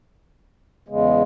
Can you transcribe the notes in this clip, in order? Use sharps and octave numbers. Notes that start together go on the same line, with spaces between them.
E2 C#3 G#3